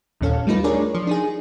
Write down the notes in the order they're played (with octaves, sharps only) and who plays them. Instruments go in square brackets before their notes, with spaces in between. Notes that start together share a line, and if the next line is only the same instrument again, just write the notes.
[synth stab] G1 D#2 A#2 C#4 A4 F5
G3 A3 D#4 F4 B4
D4 G#4 A#4 C#5 D5
F3
D4 D#4 G#4